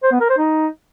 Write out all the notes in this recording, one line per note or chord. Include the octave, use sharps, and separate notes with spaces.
C5
B3
A#4
C5
D#4